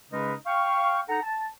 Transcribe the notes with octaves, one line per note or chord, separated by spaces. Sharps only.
C#3 G#3 C#4 D#4 A#4 B4
F5 G5 C#6
D#4 A4 F#5 A#5
A5